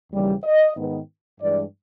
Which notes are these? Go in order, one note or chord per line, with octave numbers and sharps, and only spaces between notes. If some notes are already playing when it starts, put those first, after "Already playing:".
D#2 C#3 E3 G3
D#5
G#2 D#3 G#3 B3
G2 E3 G#3 D5